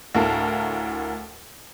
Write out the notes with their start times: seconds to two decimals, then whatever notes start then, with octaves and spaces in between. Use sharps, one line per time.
0.15 D2 A2 A#4 F5 A5